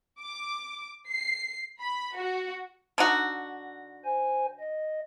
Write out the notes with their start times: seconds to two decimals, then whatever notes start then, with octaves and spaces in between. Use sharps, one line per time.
0.20 D6
1.08 C7
1.80 B5
2.16 F#4
2.98 D3 D#4 F#4
4.05 C5 G#5
4.59 D#5